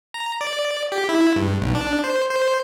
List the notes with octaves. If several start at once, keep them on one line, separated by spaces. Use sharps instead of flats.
A#5
D5
G4
E4
G2
B1
D4
C5
C5